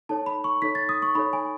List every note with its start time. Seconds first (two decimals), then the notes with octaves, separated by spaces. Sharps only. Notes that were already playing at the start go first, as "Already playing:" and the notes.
0.09 D#4 A4 C#5 A5
0.26 B5
0.44 C#6
0.62 D#4 A4 C#5 B6
0.75 A6
0.89 D#6
1.02 C#6
1.15 D#4 A4 C#5 B5
1.33 G#5